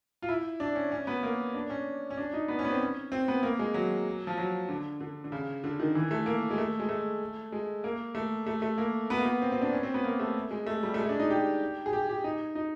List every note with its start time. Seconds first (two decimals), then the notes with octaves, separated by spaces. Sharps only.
0.22 F4
0.29 E4
0.60 D4
0.75 C#4
0.92 C#4
1.07 B3
1.23 A#3
1.54 D4
1.70 C#4
2.11 C#4
2.18 D4
2.34 D#4
2.48 B3
2.59 C#4
2.65 B3
2.70 C4
2.81 C#4
3.12 C4
3.28 B3
3.43 A#3
3.59 G#3
3.74 F#3
4.27 F3
4.38 F#3
4.69 D3
5.01 D3
5.24 D3
5.32 C#3
5.64 D3
5.80 D#3
5.95 E3
6.11 A3
6.26 A#3
6.51 G#3
6.58 A3
6.80 G#3
6.89 A3
7.52 G#3
7.84 A#3
8.15 A3
8.47 A3
8.62 A3
8.78 A#3
9.10 B3
9.18 A#3
9.26 B3
9.42 C4
9.52 C4
9.62 D4
9.73 C#4
9.83 C4
9.94 B3
10.04 A#3
10.20 A3
10.51 G#3
10.67 A3
10.83 G3
10.94 A3
10.98 G#3
11.09 D4
11.19 D#4
11.30 G4
11.86 G#4
11.93 G4
12.09 G4
12.24 D#4
12.55 D#4